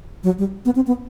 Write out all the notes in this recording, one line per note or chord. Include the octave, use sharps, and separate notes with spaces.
F#3
G3
B3
C4
B3